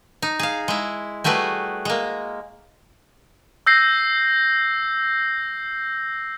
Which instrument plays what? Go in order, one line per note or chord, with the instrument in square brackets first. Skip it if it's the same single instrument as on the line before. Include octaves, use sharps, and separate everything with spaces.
[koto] D#4
G#4 F5
G#3 E4
G3 A3 F#4 G#4 B4
G#3 A#3
[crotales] E6 G6 A#6 C7